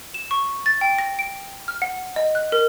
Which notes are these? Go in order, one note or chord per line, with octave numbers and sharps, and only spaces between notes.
E7
C#6
A6
G5
A#6
D7
F6
F#5
D#5
F#6
A#4